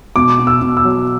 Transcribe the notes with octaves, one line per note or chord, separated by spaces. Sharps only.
B2 D6
B2
E6
B2
E6
F#3